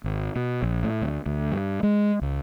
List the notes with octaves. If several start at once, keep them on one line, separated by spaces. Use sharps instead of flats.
G#1
B2
A#1
A2
D2
D2
G2
G#3
C#2